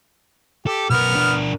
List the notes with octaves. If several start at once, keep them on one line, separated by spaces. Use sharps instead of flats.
G4 A4
B1 B3 A#4 F6
D4 A#4